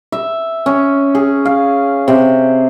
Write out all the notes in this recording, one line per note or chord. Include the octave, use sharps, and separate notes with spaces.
E5
C#4
G#4
F5
C3